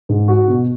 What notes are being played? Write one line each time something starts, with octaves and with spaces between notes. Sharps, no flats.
G#2
F#4
B2